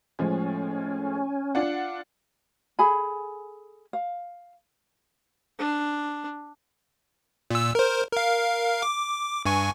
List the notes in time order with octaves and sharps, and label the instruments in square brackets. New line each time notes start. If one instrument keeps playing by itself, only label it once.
[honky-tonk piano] A2 F3 G#3 [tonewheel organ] C#4
[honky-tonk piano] D4 F4 F#5
[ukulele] G#4 A4 G#5 B5
F5
[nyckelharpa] D4
[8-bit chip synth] A#2 E6
A#4 C5
A#4 F5
D6
G2 G#5 C#6